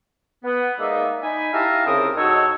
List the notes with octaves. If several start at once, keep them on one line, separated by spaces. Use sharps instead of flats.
B3
G#3 A#3 D#4 D5 E5
D#4 G#5 B5
E4 G4 E5 F5 A5 A#5
C2 C#3 C4 A#4 D#6
G#2 D#4 F#4 A4 C#5 E6